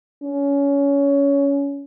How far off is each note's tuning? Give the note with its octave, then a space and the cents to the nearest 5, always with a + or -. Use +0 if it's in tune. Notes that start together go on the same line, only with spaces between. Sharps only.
C#4 +20